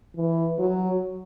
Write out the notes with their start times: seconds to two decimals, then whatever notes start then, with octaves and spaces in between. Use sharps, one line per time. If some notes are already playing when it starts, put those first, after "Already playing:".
0.16 E3
0.59 F#3